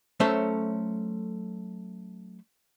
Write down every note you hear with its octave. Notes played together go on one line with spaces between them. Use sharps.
F#3 A3 C#4 A4 C5 E5